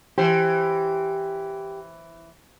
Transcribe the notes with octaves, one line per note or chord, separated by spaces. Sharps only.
E3 G4 C5